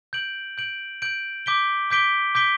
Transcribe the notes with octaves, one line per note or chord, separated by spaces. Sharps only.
G6 D7 F#7
G6 D7 F#7
G6 D7 F#7
D6 G6 B6 D7 G7
D6 G6 B6 D7 G7
D6 G6 B6 D7 G7